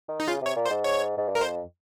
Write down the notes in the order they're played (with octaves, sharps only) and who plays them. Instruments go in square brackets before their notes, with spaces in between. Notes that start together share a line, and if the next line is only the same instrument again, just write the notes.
[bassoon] D#3
[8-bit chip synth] D#4
[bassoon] C#3 [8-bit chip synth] F4
[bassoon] C3 [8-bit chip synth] C#5
[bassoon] A#2
[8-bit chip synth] C5
[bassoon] G#2
[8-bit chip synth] C#5
[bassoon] G#2
G2
[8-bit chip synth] A#4
[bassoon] F2 [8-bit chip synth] C5